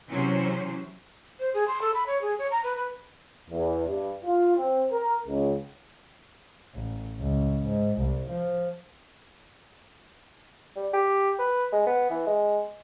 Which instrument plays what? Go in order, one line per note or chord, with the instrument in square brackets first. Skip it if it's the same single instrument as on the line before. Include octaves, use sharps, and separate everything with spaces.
[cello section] C3 E3 F#3 C#4 C5
[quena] C5
G#4
C6
A4
B5
C#5
G#4
C#5
A#5
B4
B4
[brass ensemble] E2
G2
F4
C4
A#4
C#2
[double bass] A1
C#2
G#2
C2
F3
[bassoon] G3
G4
B4
G#3
B3
E3
G#3